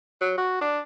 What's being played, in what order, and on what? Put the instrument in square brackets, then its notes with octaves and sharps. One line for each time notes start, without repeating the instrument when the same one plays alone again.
[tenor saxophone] F#3
F#4
D4